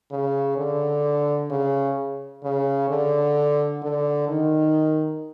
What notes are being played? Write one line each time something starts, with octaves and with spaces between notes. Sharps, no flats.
C#3
D3
C#3
C#3
D3
D3
D#3